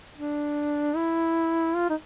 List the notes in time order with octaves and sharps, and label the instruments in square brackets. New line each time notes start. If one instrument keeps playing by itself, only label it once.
[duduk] D4
E4
F4
D#4